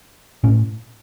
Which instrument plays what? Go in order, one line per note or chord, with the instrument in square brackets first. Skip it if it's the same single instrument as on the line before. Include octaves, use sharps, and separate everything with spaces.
[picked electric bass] A2 C#4